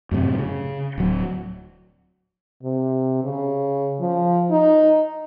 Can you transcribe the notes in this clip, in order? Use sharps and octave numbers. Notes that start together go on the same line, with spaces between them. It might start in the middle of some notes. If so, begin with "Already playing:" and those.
F#2 A2 C3
C#3
D1 F#3
C3
C#3
F3
D#4